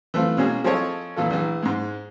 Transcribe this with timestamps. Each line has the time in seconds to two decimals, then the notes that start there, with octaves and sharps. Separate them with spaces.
0.14 E3 A3 C4 F4
0.37 B2 G#3 A#3 C#4 G#4
0.64 F3 C4 G#4 A4 C#5 D#5
1.16 A#2 E3 F4 A4
1.30 A#1 E3
1.63 G#2 G#3